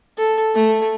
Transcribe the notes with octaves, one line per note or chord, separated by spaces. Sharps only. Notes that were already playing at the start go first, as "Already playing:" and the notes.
A4
A3